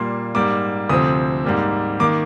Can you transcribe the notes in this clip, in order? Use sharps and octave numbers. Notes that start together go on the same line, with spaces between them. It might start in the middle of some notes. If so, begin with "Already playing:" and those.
Already playing: A#2 G3 A#3 C6
G#2 G3 A#3 D6
D2 C3 F3 C4 D#6
G#2 G3 A#3
D#3 A#3 D6